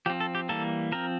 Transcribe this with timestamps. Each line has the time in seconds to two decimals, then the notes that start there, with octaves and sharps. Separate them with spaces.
0.06 F3 C4 G4
0.20 A4
0.35 G4
0.49 E3 G3 A#3 A4
0.92 F3 C4 A#4